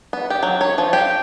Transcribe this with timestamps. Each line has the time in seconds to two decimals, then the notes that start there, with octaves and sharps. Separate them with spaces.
0.13 B3
0.30 G4
0.43 F#3
0.61 C#5
0.78 F3
0.93 G4